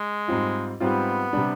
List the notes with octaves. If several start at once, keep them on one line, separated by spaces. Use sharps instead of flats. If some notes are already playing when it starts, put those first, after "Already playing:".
Already playing: G#3
G#2 G3 C4 F4
G#2 G3 B3 C4 F4
C3 G3 D4